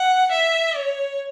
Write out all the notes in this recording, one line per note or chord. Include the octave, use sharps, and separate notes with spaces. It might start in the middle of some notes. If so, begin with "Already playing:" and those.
Already playing: F#5
E5
C#5